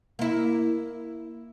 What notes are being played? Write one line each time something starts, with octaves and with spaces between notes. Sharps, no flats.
A#3 E4